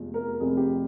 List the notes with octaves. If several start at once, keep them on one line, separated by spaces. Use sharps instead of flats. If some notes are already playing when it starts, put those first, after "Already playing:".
Already playing: F1 E2 C3 F3 G#3
A#4
F1 F2 C3 G#4
G4